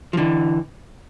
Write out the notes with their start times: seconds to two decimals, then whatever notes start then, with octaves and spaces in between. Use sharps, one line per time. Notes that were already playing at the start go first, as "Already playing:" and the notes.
0.13 F3
0.17 D3 E3